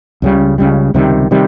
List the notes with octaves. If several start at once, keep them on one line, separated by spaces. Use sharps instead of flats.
C#2 C#3 G3
C#2 C#3 G3
C#2 C3 D#3 G3
C3 D#3 G3